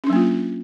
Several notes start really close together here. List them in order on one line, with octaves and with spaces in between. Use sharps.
C#4 D4 F#3 A#3 F4